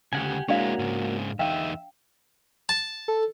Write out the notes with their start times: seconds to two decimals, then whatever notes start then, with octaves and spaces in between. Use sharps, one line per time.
0.13 D2 C#3 G4 F#5 G#5
0.48 G#3 A#3 D4 E4 F#4 C#5 D5 F5
0.79 G#2 C#3
1.39 E2 D#4 E5 F5 G5
2.69 A5
3.08 A4